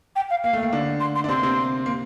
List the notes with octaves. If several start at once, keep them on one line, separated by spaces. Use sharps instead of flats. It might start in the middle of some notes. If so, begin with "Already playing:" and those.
G5
F5
A#3 F5
A3
A#3
D3 D4
C6
C6
D4
C3 C4 C6
A#3
C3 C4
A#3